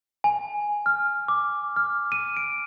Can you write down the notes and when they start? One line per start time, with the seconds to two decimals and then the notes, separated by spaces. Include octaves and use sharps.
0.24 G#5
0.86 F6
1.28 D6
1.76 F6
2.12 D#7
2.37 D7